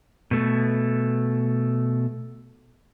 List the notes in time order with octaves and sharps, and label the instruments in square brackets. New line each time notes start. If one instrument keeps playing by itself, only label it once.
[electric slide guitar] B2 A3